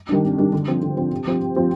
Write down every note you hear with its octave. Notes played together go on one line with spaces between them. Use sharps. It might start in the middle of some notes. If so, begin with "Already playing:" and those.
D#3 G3 D4
C3
D#3 G3 D4
D3
F3 C4
D3
F3 C4
C3
F3 C4 G4
C3
F3 C4 G4